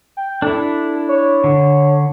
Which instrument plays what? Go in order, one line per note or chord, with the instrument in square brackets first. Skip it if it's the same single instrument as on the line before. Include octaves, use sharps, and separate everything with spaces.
[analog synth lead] G5
[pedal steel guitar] D4 E4 [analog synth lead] A4
[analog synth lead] C#5
[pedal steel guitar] D3